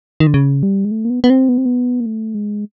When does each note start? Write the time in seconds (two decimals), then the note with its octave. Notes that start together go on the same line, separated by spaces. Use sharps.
0.20 D#3
0.27 D3
0.34 C#3
0.63 G3
0.85 G#3
0.91 A3
1.05 A#3
1.10 B3
1.24 B3
1.30 C4
1.49 B3
1.58 C4
1.66 B3
2.00 A#3
2.06 A3
2.35 G#3